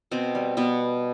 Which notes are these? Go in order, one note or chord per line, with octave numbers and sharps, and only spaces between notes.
B2 C4
G3
B2 B3